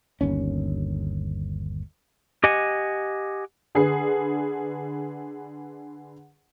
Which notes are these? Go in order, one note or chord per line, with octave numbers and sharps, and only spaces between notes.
G1 D#2 C#4
G4 D#5 F#5 G#5
D3 G#4 B4 C7